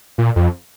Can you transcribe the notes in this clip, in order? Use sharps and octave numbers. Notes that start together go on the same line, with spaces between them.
A#2
F2